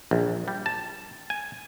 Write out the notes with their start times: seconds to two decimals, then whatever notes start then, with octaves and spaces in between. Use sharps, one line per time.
0.11 A#1
0.48 G3
0.66 A5
1.30 G#5